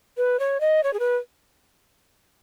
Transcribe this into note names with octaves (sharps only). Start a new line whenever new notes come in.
B4
C#5
D#5
C#5
G#4
B4